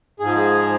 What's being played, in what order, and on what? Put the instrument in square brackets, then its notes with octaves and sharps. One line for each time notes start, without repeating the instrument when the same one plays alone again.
[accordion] G#2 F3 G#4